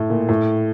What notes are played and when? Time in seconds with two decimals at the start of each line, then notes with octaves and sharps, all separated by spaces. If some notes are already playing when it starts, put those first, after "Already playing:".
Already playing: A2
0.10 A#2
0.29 A2